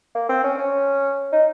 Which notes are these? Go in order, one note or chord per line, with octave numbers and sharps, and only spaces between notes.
A#3
C4
C#4
C#4
D#4